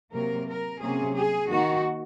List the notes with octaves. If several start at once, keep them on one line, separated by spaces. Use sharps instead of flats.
C3 F#3 A#3 A#4
A#4
C3 F#3 A#3 C#4 G#4
G#4
D#3 A#3 D#4 F#4